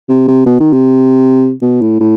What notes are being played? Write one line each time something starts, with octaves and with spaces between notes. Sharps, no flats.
C3
C3
B2
D#3
C3
B2
A2
A2